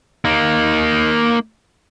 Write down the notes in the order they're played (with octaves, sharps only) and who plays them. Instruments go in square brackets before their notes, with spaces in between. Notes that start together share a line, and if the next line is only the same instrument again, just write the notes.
[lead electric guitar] A#3 D#4